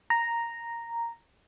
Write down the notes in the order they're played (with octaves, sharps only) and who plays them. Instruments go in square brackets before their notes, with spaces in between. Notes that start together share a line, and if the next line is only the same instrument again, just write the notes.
[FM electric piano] A#5